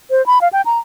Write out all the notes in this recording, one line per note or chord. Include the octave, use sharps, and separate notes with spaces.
C5
B5
F5
G5
A#5